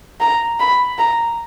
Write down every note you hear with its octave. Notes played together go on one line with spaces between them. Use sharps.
A#5
B5
A#5